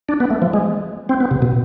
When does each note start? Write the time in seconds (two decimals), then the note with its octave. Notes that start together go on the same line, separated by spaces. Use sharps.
0.09 D4
0.20 B3
0.30 A3
0.42 F3
0.54 G#3
1.09 C4
1.20 B3
1.31 C3
1.42 B2